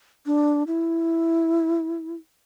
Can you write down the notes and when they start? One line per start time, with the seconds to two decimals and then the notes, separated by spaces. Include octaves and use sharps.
0.26 D4
0.67 E4